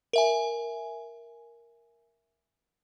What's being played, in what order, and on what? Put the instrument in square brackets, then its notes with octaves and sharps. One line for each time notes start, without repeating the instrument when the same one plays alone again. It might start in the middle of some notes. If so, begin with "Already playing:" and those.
[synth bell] A#4 E5 G#5